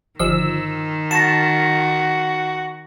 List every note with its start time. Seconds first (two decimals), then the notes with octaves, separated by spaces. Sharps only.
0.19 G1 D#3 F3 E6
1.11 F#4 A5 A#6 E7